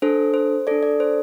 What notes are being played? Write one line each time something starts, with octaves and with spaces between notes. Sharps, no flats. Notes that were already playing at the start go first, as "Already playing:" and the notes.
D4 A4 C5
C5
D4 A4 D5
D5
C5